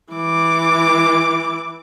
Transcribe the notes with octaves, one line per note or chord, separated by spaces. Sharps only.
E3 D6